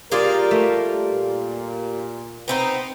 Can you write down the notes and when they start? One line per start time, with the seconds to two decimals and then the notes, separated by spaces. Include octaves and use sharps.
0.12 G3 A#3 F4 G#4 A#4 D5
0.51 A3
1.11 A#2
2.48 B3 C4 D#4